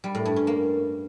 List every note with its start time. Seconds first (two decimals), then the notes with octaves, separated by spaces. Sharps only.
0.04 G3
0.15 A2
0.25 G2
0.36 C#4
0.47 A#3